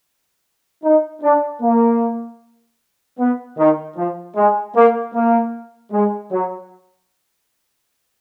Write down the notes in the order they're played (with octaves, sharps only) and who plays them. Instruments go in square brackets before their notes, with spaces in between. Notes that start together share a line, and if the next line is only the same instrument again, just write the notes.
[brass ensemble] D#4
D4
A#3
B3
D#3
F3
G#3
A#3
A#3
G#3
F#3